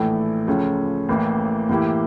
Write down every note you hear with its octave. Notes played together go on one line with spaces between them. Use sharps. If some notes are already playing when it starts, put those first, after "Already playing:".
Already playing: A#1 A2 E3 A3 E4
C#2 C#3 F3 A3 C#4
A1 A2 E3 A#3 E4
A2 E3 A#3 E4 G4